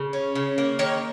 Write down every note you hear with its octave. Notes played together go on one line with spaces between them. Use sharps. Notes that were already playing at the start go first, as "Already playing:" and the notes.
Already playing: C#3
C#4
C#3
A#3
D#3 C#5